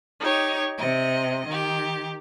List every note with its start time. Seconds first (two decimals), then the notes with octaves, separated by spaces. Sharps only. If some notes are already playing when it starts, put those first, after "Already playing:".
0.21 D#4 G4 C#5
0.78 C3 D#5
1.46 D#3 G4